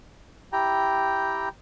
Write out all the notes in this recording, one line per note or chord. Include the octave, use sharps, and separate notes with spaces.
E4 G4 G5 A#5